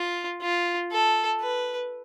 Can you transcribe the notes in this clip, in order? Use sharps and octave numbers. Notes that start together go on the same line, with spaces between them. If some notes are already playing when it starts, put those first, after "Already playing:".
Already playing: F4
F4
A4
B4